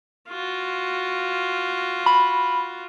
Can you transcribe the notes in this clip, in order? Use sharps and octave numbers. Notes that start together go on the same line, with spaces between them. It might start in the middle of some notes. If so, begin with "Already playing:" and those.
F4 F#4
B5